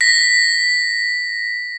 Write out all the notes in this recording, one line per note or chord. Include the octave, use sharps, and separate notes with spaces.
A#6 B6